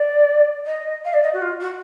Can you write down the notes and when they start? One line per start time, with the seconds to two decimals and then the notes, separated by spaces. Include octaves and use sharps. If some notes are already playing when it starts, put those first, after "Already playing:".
Already playing: D5
0.66 D#5
1.04 F5
1.13 D5
1.23 D#5
1.33 F#4
1.41 F4
1.60 F#4